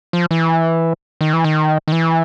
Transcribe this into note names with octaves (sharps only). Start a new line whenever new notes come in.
F3
E3
D#3
E3
D#3
D#3
E3